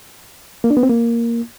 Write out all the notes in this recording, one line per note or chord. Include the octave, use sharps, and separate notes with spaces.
A#3
D4
B3
C4
A#3